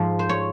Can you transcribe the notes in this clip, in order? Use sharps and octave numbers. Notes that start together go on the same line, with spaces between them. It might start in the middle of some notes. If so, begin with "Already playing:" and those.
Already playing: G#2 F3
C5
C#5